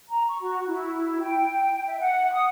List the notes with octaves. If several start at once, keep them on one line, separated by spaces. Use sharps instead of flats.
A#5
C#6
F#4
E4
G5
E5
F#5
D#6